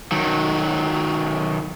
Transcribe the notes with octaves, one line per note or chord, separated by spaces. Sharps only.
D#3 F#3